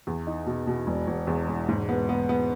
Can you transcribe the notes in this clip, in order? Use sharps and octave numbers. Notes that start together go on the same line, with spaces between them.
E2
D#4
B2
B2
E1
E1
E2
E1
G#2
B3
B3
B3